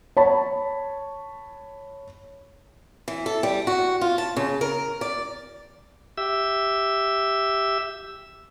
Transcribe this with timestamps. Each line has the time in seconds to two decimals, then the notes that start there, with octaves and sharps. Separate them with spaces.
0.17 C#5 A5 B5
3.08 E3
3.26 A4
3.43 G3
3.67 F#4
4.01 F4
4.18 A5
4.36 C#3
4.61 A#4
5.01 D5
6.18 G4 E5 E6